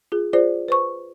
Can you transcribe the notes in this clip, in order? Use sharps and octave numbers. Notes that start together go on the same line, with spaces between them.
F4 G#4
F4 G#4 C5 D5
B4 C5 C#6